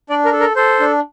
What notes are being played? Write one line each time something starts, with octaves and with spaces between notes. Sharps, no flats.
D4 D5
A#4
A4
A#4
A4 C5
D4